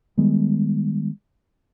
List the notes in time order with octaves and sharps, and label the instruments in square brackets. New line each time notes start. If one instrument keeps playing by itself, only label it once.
[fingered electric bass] D#3 G3 G#3 B3